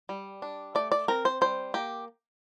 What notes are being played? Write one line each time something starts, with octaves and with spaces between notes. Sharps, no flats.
G3
D4
A3 D5
D5
C4 A#4
C5
G3 C5
A#3 G4